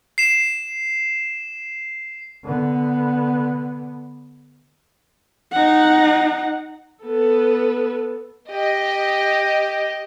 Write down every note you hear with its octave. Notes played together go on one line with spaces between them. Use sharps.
C7 E7
D3 B3
D#4 F#5
B3 A4
G4 D#5